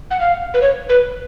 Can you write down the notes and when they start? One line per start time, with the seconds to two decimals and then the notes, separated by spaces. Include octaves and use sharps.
0.11 F#5
0.20 F5
0.54 B4
0.62 C#5
0.89 B4